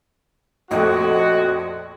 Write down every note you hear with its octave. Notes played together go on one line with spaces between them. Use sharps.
A#1 F2 A3 F#4 D#5